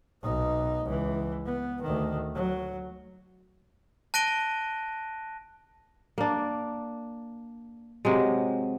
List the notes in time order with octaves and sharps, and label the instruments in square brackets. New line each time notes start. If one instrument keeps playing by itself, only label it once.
[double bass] B1 D#4
C#2 E3
B3
D2 D#3
F#3
[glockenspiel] A5 F#6 A#6 D7 D#7 G7
[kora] A#3 D4
C3 F#3 G#3